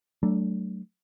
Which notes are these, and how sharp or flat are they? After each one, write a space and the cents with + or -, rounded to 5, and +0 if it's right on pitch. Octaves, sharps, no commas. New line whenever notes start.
F#3 +40 A3 +0 D4 +0